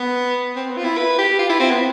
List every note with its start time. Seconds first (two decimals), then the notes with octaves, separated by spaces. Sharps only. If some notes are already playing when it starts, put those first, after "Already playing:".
Already playing: B3
0.56 C4
0.70 B3
0.77 F4
0.84 E4
0.97 B4
1.18 G4
1.39 F4
1.49 E4
1.60 C4
1.71 B3